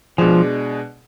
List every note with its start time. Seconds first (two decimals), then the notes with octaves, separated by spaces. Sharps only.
0.18 B2 F3 G#3 D4 G#4